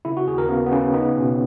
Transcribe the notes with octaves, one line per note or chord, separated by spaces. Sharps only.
C#3 E4
F#4
D#2 G#4
A#4
C#3 B3
B3
C#3 C#4
B3 D#4
B2 C#4